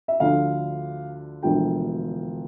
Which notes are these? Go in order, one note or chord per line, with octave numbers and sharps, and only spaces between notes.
E5
D2 D3 F3 F5
E1 D2 D3 F3 G5